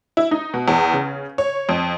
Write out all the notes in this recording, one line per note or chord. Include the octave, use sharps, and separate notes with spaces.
E4
D#4
B2
E2
C#3
C#5
F2